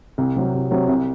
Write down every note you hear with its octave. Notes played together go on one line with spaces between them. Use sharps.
C2
C3 F#3
C2
C3 F#3
C2